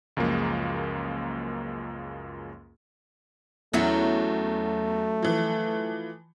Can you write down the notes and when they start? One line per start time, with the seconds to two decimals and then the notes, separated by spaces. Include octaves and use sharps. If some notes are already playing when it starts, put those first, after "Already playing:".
0.17 C#2 F#2 F3 G#3 A#3
3.74 E2 F#3 A3 C#4 E4
5.23 E3 F3